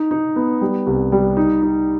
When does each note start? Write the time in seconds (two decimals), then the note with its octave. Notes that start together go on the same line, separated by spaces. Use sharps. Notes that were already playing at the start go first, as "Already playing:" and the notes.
Already playing: D#4
0.11 D#4
0.36 B3
0.61 G3
0.86 C2
1.12 G3
1.37 D#4
1.62 D#4